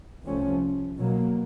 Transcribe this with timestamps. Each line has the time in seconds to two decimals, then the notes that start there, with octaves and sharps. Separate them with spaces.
0.25 C2 C3 F3 A3 C#4
0.98 B2 F#3 A#3